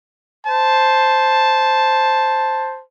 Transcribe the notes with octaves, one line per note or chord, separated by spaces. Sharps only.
C5 A5